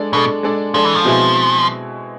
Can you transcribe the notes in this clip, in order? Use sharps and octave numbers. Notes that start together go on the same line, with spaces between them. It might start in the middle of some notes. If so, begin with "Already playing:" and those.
Already playing: G#3 D4 A4 D5
B2 G#3 D4 A4 D5
G#3 D4 A4 D5
F3 G#3 D4 A4 D5
E3
F3
B2 G#3 C4 E4 G#4